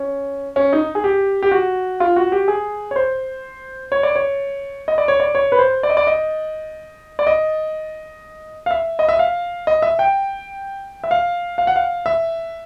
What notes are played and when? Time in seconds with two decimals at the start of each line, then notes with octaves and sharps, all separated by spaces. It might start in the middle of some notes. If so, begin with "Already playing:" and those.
Already playing: C#4
0.56 C#4
0.73 D#4
0.95 G#4
1.04 G4
1.43 G4
1.51 F#4
2.00 F4
2.16 F#4
2.32 G4
2.48 G#4
2.91 C#5
2.96 C5
3.92 C#5
4.03 D5
4.15 C#5
4.88 D#5
4.98 D5
5.08 C#5
5.20 D5
5.35 C#5
5.52 B4
5.59 C5
5.83 D5
5.90 D#5
5.97 D5
6.07 D#5
7.19 D5
7.27 D#5
8.66 F5
8.71 E5
8.99 D#5
9.09 E5
9.19 F5
9.67 D#5
9.82 E5
9.99 G5
11.04 E5
11.11 F5
11.58 F5
11.67 F#5
11.76 F5
12.06 E5